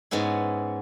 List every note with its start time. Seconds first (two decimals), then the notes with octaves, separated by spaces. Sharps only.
0.11 G#2 G#3 B3 C#4 E4